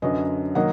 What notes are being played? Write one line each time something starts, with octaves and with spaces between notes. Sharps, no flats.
F#2 D3 F#3 B4 D#5
D#3 F#3 A#3 D#5 F#5